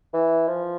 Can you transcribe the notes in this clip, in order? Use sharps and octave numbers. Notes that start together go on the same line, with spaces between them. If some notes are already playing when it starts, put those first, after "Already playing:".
E3
F3